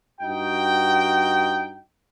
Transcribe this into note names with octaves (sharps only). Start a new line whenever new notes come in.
G2 D#4 F#4 G5